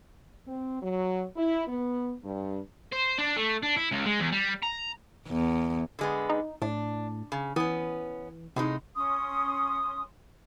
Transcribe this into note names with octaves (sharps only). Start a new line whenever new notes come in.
C4
F#3
E4
B3
G2
C5
D4
A3
D4
E4
C#2
G#3
E2
G3
A#5
E2
D3 G#3 B3
D#4
A2 D4
C#3
E3 B3 C#4
A2 C3 G#3 D#4
C#4 C6 D#6